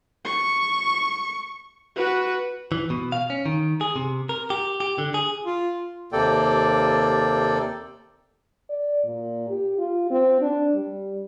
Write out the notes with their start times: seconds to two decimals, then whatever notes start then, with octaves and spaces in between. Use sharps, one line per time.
0.25 C#6
1.96 F#4 B4
2.72 E3
2.90 B2
3.12 F5
3.30 C#4
3.46 D#3
3.81 G#4
3.96 C3
4.29 A#4
4.50 G4
4.80 G4
4.98 D3
5.14 G#4
5.45 F4
6.13 D#2 C3 A#3 A4 D5 G5
8.69 D5
9.04 A#2
9.48 G4
9.78 F4
10.10 C4
10.42 D4
10.74 G3